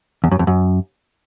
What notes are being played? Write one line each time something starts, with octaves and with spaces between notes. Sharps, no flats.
E2
F#2
F2
F#2